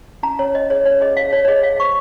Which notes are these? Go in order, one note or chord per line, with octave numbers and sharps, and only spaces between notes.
C#4 A#5
C#4 C#5
C#5 D#5
G#4 C#5
C#4 C#5
G#4 D#5
C#5 F5
C#5
C#5
G#4 D#5
G#4 F5
C5 C#6